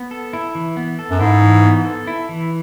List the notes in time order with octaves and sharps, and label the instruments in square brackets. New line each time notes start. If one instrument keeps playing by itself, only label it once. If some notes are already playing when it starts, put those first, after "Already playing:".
Already playing: [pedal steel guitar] B3
A4
E4
E3
B3
A4
[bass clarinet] F#2
[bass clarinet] G#2 [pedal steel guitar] E4
[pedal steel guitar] E3
B3
A4
E4
E3